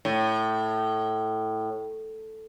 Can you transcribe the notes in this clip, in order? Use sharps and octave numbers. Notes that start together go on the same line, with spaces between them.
A2